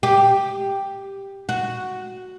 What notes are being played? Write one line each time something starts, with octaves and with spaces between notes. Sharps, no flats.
G4
F#4